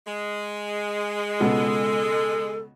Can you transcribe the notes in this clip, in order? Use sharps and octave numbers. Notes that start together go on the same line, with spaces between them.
G#3
C#2 B2 A4